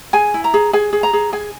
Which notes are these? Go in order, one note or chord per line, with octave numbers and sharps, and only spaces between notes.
G#4 G#5
E4
A#5
G#4
G#4 G#5
G#4
A#5
G#4
G#4 G#5